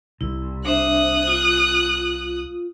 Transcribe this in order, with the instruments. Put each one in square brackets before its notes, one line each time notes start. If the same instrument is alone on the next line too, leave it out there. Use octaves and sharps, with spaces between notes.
[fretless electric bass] C2 [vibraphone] E4
[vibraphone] D4 C5 E5 [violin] D#6 F#6
[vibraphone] F4